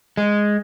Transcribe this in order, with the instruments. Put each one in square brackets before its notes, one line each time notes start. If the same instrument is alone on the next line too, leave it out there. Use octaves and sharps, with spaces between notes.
[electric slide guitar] G#3